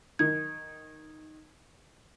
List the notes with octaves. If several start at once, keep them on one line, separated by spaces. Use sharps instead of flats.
D#3 D#4 G#6